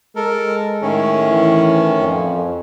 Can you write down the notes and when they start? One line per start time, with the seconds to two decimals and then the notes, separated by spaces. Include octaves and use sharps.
0.16 G#3 A4 A#4
0.82 A2 D#3 C#4
1.30 E3
2.01 F2